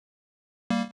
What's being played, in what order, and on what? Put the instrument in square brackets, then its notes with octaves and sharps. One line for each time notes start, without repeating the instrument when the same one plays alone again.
[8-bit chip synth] G3 A#3